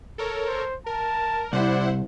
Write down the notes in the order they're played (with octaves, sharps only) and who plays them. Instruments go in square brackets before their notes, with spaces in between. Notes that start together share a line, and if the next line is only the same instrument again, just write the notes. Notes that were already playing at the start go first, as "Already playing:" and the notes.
[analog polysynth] A4 A#4 C#5
[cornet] C5
[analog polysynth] A#4 [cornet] A5
[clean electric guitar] C2 [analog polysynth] E4 C5 F#5 [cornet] D5